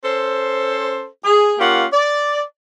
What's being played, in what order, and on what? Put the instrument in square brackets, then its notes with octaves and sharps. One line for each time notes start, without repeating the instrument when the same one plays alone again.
[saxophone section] C#4 A4 C5
G#4
A#3 C#4 F4 G4 F#5
D5